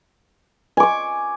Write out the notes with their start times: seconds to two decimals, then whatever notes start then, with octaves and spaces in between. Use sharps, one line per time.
0.77 G#5
0.80 D6
0.83 C#6